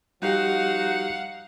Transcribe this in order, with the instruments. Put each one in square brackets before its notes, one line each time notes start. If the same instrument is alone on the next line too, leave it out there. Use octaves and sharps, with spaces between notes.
[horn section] F3 D#4 F#4 [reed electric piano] G3 G4 [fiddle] F5 F#5